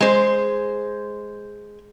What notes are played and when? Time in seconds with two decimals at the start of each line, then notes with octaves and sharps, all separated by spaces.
0.01 G#3 C5